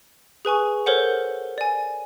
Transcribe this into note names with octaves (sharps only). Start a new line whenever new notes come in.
G#4 B4 G#5 C#6
A4 A#4 C5 C#5 F#5
D5 G#5